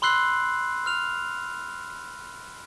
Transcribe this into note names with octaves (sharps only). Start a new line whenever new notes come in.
B5 C6 E6 F#6 C7 F#7
F6 F7